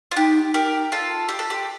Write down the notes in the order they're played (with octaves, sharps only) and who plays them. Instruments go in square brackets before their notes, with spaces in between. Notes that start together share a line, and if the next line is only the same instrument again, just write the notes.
[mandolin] F4
[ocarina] D#4 [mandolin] G4
[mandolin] G4 A#4
F4 A4
G4
A4
G4